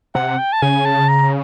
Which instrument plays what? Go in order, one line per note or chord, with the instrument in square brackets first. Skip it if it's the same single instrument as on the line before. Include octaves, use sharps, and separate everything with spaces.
[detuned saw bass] C3 [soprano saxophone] F#5
[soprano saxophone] G5
A5
[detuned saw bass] C#3 [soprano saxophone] G#5
[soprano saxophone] A5
A#5